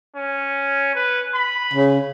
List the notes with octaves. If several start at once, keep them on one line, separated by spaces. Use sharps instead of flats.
C#4
B4
B5
C#3